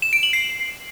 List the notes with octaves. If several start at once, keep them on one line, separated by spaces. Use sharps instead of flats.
E7
D7
F#7
C7